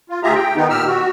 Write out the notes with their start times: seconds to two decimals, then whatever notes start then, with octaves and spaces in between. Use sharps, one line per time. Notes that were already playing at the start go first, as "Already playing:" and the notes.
0.09 F4
0.23 D2 F4 G4 G#4 E5 A#5
0.35 G5
0.56 D#3 B3 D#4
0.70 A#2 G4 E6 F6
0.88 F#4